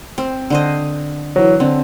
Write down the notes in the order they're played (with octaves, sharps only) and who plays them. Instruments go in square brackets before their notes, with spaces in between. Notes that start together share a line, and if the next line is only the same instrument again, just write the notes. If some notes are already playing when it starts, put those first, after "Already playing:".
[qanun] C4
D3 C5 D#5
[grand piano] E3 F#3
[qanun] D3 [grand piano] C4